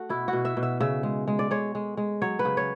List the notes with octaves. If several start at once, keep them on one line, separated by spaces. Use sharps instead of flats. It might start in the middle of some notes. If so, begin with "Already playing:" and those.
Already playing: A3 F#4
B2 E4
F#4
B2
E5
B2
E5
C#3 E5
G#3
G#3
D5
G#3 C#5
G#3
G#3
F#3 C#5
B4
C#3
C#5